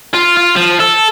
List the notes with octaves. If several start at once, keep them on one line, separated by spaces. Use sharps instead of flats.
F4
F4
F3
A4